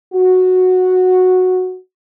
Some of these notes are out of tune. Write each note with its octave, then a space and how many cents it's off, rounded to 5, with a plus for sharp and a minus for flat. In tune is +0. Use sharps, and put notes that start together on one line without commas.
F#4 -5